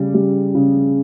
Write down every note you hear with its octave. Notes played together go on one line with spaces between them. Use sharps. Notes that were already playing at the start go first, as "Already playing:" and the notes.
Already playing: C#3 G3
G3
C#3